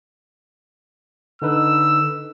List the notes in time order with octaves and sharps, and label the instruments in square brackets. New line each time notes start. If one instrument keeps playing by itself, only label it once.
[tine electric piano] D3 D#4 B4 [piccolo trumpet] E6